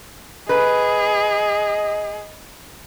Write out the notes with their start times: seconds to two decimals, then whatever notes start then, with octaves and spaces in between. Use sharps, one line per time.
0.49 G#4 B4 D#5